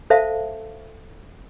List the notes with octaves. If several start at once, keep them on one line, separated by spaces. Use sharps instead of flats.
A4 C5 E5 F5 A5